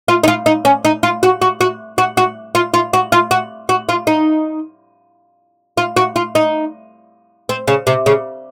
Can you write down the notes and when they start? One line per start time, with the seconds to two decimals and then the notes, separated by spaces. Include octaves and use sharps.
0.08 F4
0.23 D#4
0.28 F4
0.46 D#4
0.65 C#4
0.85 D#4
1.03 F4
1.23 F#4
1.42 F#4
1.61 F#4
1.98 F#4
2.17 F#4
2.55 F4
2.74 F4
2.93 F#4
3.12 F4
3.31 F#4
3.69 F#4
3.89 F4
4.07 D#4
5.77 F4
5.97 F#4
6.16 F4
6.35 D#4
7.49 C4
7.68 C#3
7.87 C3
8.06 C#3